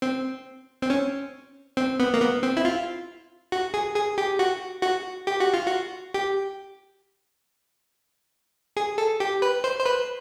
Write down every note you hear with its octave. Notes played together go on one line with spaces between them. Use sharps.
C4
C4
C#4
C4
B3
A#3
B3
C4
E4
F4
F#4
G#4
G#4
G4
F#4
F#4
G4
F#4
F4
F#4
G4
G#4
A4
G4
B4
C5
C5
B4